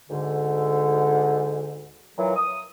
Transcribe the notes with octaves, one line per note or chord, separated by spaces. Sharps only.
D2 G#2 D3
A#2 E3 F#3
D#6